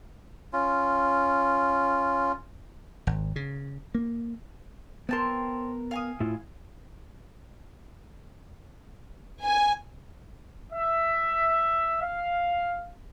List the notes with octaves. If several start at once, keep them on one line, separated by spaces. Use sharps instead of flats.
C#4 F4
G#1
C#3
A#3
B3 C4 A#4 A5 C6
F5 G#5 D#6
A2 E4 F4
G#5
E5
F5